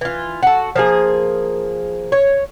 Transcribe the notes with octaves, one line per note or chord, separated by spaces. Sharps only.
E3 F4
F#4 A4
F3 A#3 G#4
C#5